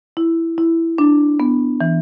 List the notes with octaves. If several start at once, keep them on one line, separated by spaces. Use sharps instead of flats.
E4
E4
D4
B3
E3